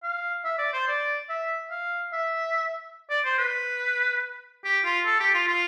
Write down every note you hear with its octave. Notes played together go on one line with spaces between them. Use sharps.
F5
E5
D5
C5
D5
E5
F5
E5
D5
C5
B4
G4
F4
A4
G4
F4
F4